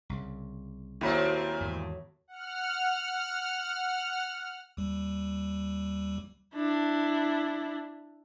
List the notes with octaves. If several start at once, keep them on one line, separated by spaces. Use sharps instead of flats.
C2 C#3
D#2 A#2 F#3 A3 C4 E4 B5
E2 G#2 D#3
F#5 F6
D#2 G3
D4 E4